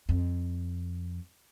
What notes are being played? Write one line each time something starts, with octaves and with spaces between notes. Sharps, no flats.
F2